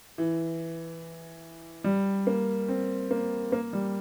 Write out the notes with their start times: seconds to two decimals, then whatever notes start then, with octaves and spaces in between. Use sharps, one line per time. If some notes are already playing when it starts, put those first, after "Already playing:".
0.18 E3
1.84 G3
2.27 A#3
2.68 C4
3.11 A#3
3.52 A#3
3.73 G3